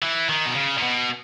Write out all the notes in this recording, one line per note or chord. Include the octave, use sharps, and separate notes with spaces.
E3
D#3
B2
C#3
A#2
B2